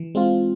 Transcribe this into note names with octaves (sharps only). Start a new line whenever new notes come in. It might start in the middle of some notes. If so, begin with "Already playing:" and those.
Already playing: E3
G#3 C4 F4